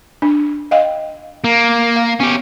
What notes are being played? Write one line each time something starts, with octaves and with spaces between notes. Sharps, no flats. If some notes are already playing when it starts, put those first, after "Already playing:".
D4
D#5 F5 G5
A#3
F5
B3 C#4 G4